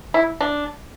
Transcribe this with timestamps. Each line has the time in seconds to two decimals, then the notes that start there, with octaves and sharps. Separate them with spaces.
0.14 E4
0.41 D4